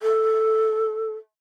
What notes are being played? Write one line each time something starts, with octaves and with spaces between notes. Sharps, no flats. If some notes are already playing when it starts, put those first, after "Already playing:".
A4